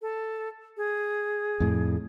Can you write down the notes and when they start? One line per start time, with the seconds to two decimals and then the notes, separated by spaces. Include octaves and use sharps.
0.02 A4
0.77 G#4
1.60 F2 A2